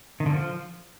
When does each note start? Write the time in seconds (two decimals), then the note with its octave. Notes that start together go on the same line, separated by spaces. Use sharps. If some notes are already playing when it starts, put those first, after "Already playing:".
0.20 D#3
0.26 D3
0.32 F3